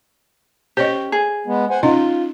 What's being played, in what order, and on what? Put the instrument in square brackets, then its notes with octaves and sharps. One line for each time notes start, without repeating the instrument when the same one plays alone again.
[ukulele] C#4 G4 [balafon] C5 C#5 D#5
[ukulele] G#4
[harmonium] G#3 B3
C5 F#5 G#5
[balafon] C#4 D#4 D#5 [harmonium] F4